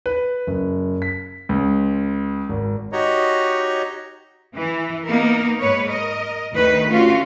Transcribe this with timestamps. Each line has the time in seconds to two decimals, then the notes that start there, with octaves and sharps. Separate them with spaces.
0.06 B4
0.47 F#1
1.02 B6
1.49 C#2
2.49 G#1
2.92 D#4 F#4 G4 C#5 D#5 A#5
4.56 E3
5.06 A#3 B3 D#4 A#4
5.59 G#2 B4 C#5
5.89 A#4 D#5
6.52 D2 D#3 D#4 B4
6.90 A3 C#4 F4 F#4